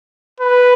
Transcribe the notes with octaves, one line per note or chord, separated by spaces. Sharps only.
B4